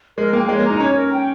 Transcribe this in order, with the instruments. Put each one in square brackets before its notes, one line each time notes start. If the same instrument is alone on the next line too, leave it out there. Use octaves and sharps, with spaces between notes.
[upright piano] G#3 [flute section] A#4
[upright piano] A#3 [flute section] G5
[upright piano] G#3 [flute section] C#5
[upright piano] A#3
[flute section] A#5
[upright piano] D#4
[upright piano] C#4 [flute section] C#5
[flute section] A#4
G5